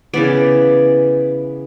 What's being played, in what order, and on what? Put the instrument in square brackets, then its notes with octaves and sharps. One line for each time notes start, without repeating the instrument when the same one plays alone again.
[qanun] C#3 E3 B3 D5